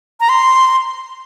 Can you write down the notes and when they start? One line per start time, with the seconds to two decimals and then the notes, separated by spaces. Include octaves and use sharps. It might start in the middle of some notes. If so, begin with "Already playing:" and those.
0.20 A#5
0.29 C6